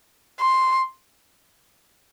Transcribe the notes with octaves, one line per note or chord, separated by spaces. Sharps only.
C6